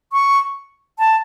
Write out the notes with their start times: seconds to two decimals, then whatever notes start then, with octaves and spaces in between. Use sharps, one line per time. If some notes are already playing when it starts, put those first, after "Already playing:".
0.13 C#6
0.99 A5